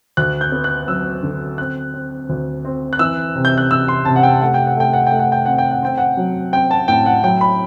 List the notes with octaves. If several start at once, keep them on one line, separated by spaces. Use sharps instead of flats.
D2 F#6
G6
B3
F#6
F#3 E6
D3
C4 F#6
C4
D2
C4
F#6
E3 E6
C3
G6
F#6
C3 E6
C6
C3 A5
F#5
G5
A3 F#5
G5
F#5
A3 G5
F#5
A3 G5
F#5
G5
C4 F#5
G5
F#5
C4 G5
F#5
F#3
C4 G5
A5
A2 G5
F#5
F#3 G5
B5